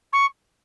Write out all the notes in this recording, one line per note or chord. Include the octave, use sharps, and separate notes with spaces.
C#6